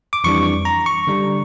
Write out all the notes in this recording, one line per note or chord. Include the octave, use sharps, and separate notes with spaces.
D6
F2 E3 G3 D4 C#6
A#5
C#6
D3 G3 D4